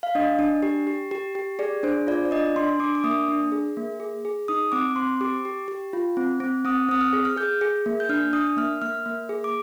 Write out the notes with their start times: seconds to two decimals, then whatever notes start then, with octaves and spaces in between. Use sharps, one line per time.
0.03 F5
0.15 D4 D#5
0.39 D4
0.63 G4
0.87 G4
1.11 G4
1.35 G4
1.59 G#4 D5
1.83 D4 C5
2.07 F4 D5
2.25 D5
2.31 D4 D#5
2.56 D4 C6
2.79 D4 D6
2.95 D6
3.04 A#3 D#6
3.29 D4
3.52 G#4
3.77 A#3
4.00 G#4
4.25 G#4
4.48 D#4 D#6
4.72 C4 D6
4.96 C4 C6
5.21 G4 D6
5.45 G4
5.68 G4
5.93 F4
6.17 C4
6.40 C4
6.65 C4 D#6
6.89 C4 D#6
7.01 F6
7.13 G#4
7.25 F6
7.37 G#4 G6
7.61 G#4
7.86 A#3
8.00 G6
8.09 D4 F6
8.33 D4 D#6
8.57 A#3 F6
8.82 A#3 F6
9.06 A#3
9.29 G#4
9.44 D6